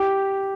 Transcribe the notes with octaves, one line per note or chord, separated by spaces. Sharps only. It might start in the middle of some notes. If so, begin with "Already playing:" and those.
Already playing: G4